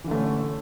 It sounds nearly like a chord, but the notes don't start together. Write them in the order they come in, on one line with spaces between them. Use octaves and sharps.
E3 D3 A3 C#4